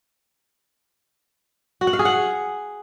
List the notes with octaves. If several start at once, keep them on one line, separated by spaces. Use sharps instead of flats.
F#4
F#5
F5
G#4
F#5